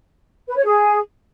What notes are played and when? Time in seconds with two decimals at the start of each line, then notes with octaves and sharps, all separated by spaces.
0.48 B4
0.56 C#5
0.64 G#4